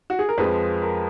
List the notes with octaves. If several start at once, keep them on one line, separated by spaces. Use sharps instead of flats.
F#4
G#4
A#4
F2 F3 G#3 B4
A#4